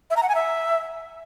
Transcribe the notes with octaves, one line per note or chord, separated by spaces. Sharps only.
E5
A#5
F#5
G#5
E5